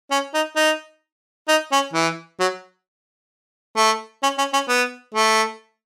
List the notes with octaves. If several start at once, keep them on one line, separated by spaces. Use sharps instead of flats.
C#4
D#4
D#4
D#4
C#4
E3
F#3
A3
C#4
C#4
C#4
B3
A3